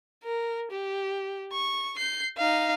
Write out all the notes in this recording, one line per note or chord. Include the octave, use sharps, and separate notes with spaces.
A#4
G4
C#6
G6 C7
D#4 F5